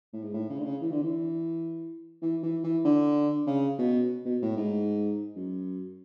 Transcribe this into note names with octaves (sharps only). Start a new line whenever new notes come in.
A2
G#2
A2
C#3
D3
C#3
E3
D3
E3
E3
E3
E3
D3
C#3
B2
B2
A2
G#2
F#2